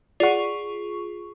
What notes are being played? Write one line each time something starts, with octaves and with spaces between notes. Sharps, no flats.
F4 G#4 D5 F#5 C#6